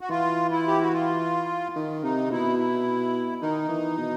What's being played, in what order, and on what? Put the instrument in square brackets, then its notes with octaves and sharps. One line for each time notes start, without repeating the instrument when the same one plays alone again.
[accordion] F#4
[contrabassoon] E3 [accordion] F4
[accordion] E4
G4
F#4
F4
[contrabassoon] D#3
[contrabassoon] C3 [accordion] D#4
[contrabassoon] B2 [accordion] E4
[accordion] E4
[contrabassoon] D#3 [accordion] D#4
[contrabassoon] E3
B2